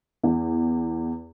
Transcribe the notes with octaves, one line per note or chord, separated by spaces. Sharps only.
E2